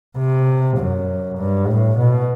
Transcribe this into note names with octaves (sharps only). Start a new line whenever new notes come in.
C3
F#2
G2
A2
B2